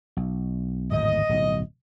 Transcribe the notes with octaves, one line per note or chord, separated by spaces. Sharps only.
B1
D1 G#1 E2 D#5
D1 B1